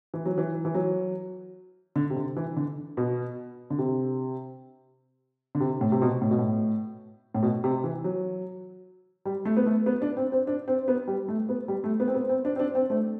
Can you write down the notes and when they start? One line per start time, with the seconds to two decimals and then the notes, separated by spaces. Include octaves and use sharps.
0.14 E3
0.25 F#3
0.38 E3
0.65 E3
0.74 F#3
1.96 D3
2.10 C3
2.16 D3
2.36 E3
2.57 D3
2.97 B2
3.70 D3
3.78 C3
5.55 D3
5.60 C3
5.81 A2
5.92 C3
6.02 B2
6.22 A2
6.31 B2
6.39 A2
7.35 A2
7.43 B2
7.64 C3
7.84 E3
8.04 F#3
9.25 G3
9.45 A3
9.57 B3
9.66 A3
9.86 B3
10.02 D4
10.17 C4
10.32 C4
10.47 D4
10.68 C4
10.88 B3
11.07 G3
11.28 A3
11.49 B3
11.68 G3
11.84 A3
12.00 B3
12.08 C4
12.14 B3
12.29 C4
12.45 D4
12.56 C4
12.59 D4
12.75 C4
12.90 A3